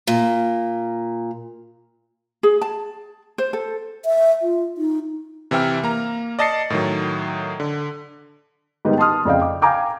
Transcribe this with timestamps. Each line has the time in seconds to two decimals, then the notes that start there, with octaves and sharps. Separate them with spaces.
0.07 A#2
2.43 G#4
2.61 A5
3.38 C5
3.53 A4
4.05 E5
4.42 F4
4.78 D#4
5.51 C3 E3 E5 G5 F6
5.83 A#3 A#5
6.39 D5 D#5 A5 A6 C7 C#7
6.70 A2 D#3 F#3
7.60 D3
8.85 G#2 D#3 G3 B3 D#4
8.98 A5 C6 D#6 F6
9.25 F2 C#3 D5 D#5 F5 G5
9.41 D6
9.62 F5 G5 G#5 A#5 D6 G6